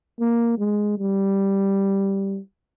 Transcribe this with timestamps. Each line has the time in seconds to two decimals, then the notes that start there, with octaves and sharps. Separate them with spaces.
0.20 A#3
0.58 G#3
0.98 G3